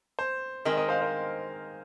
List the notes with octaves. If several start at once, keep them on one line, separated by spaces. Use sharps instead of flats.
C5
D#3 G#3 C4 A#4 D#5
A#4 D#5
C5 F5
A#4 D#5